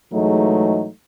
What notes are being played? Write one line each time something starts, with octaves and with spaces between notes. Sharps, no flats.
G#2 E3 F#3 G#3 A3 D#4